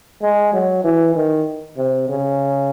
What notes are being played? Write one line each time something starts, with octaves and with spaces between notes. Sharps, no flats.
G#3
F#3
E3
D#3
C3
C#3